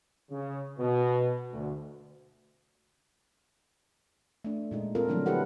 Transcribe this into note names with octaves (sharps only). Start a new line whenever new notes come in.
C#3
B2
D2
A3 D4
A#2 G#3 D#4
C4 F4 A4 A#4
D3 F3 F#3 A3 D4 E4
E4 F#4 G4 A4 B4 F#5